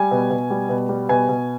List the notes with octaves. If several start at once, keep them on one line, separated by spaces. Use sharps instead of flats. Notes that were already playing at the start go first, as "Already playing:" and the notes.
Already playing: G3 G#5
B2
B2
G3
B2
G3
B2 G#5
B2